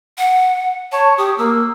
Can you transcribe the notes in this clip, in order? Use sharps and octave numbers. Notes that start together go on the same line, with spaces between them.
F#5
C#5 A5
G4 D#6
A#3 E6